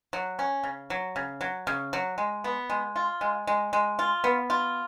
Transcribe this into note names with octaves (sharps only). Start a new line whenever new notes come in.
F#3
C#4
C#3
F#3
C#3
F#3
C#3
F#3
G#3
B3
G#3
F4
G#3
G#3
G#3
F4
B3
F4